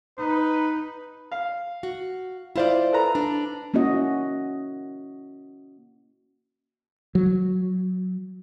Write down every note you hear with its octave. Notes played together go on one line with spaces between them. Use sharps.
D#4 B4
F5
F#4
E4 F4 C5 D5 F5
A4 B4 A#5
D4
A#3 C#4 E4 F#4 D#5
F#3